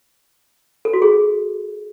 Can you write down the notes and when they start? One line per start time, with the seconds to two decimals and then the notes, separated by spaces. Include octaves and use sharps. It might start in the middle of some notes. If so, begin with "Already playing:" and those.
0.85 A4
0.93 F#4
1.02 G#4